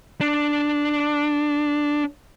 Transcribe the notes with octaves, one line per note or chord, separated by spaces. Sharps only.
D4